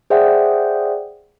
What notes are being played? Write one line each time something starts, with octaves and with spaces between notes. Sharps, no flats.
G#4 C5 D5 E5 F#5 G5